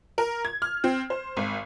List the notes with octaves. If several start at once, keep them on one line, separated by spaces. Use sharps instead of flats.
A#4
G#6
F6
C4
C5
G#1